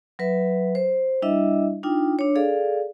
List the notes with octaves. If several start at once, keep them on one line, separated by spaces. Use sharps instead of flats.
F#3 B4 E5
C5
G3 D4 E4 D#5 E5
D4 D#4 F4 G5
D4 C#5
G#4 A4 D5 F5